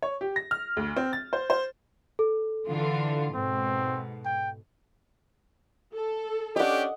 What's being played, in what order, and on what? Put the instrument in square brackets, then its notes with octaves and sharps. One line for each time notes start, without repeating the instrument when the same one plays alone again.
[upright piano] C#5
G4
A#6
F6
D2
C4
A6
C5
C5
[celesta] A4
[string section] D3 E3 F4
[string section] G#2 B2 [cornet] C4
[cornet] G5
[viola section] A4
[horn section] C#4 D4 G4 [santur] D#5 F#5